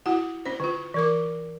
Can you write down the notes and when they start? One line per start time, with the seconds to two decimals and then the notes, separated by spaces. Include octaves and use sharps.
0.06 E4 F#4 F#5
0.45 C#4 C5
0.60 D3 F4
0.94 E3 A#4 D6